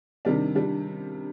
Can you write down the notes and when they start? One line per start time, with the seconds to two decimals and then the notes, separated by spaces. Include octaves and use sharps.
0.25 C3 D#3 G3 D4
0.55 G3 D4